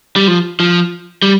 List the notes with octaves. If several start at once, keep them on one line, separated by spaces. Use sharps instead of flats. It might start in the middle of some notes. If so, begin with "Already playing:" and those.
G3
F3
F3
G3